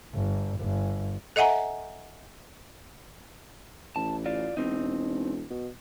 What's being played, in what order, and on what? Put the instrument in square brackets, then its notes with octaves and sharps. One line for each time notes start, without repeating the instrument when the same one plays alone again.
[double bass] G1
G1
[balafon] A4 D#5 E5 F#5 G#5 A#5
[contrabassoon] A1 [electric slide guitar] A5
[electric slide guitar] F4 D5
[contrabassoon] E1 [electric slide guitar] C4 D#4
[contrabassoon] B2